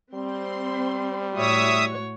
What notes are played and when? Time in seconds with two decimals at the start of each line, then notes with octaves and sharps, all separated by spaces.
0.14 G3 C4 C6
1.36 A2 F#4 C#5 E5 D#6